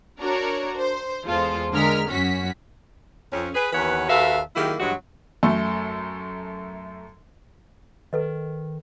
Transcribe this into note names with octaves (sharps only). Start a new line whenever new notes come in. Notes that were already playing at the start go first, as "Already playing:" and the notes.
D4 F#4 A#4 C#5
C5
E2 G#3 F4 A4 C5
D3 G#3 A#4 F6 B6
F#2 C#4 F#4 B6
F2 C#4
G#4 B4
D#2 E3 B3 B4 C#5 F#5
D#2 F#4 A4 B4 E5 F5
D#3 F#3 A#3 E4 G4 G#4
G2 E3 F#3 G#3 F#4 G4
F#2 A3 A4
D#3 A4 B4 D#5